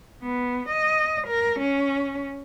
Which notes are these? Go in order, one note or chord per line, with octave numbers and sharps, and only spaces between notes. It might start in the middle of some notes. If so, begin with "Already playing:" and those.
B3
D#5
A#4
C#4